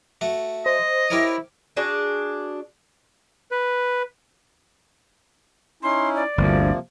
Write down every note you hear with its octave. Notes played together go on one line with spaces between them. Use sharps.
A3 F#4
C5 D#5
E4 G4 A#4 C#5
D4 F#4 G#4 D5
B4
C#4 D#4 E4 C6
D5
G1 D2 C3 F3 A#3